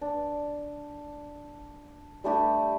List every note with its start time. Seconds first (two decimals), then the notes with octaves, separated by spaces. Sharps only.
0.01 D4
2.24 G3 A3 D4 G4